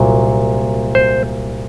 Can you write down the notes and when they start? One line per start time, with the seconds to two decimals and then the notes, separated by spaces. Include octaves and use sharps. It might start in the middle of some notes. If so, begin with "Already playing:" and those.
Already playing: C2 A#2 F#3
0.95 C5